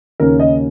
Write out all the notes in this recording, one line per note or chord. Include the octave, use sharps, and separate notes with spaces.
D#2 C#3 A#3 C#4 A#4
D#5